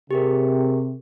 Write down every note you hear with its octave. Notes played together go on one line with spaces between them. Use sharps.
C3 G4 G#4 A#4